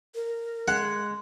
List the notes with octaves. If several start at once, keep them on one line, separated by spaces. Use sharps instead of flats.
A#4
G#3 F#5